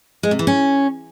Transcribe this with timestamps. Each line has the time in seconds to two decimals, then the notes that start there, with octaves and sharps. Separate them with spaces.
0.23 G#3
0.31 C3
0.39 E3
0.47 C#4